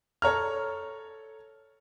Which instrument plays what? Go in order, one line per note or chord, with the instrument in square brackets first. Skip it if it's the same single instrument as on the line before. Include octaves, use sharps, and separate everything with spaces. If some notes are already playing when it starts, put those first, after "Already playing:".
[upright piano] A4 C#5 A#5 F6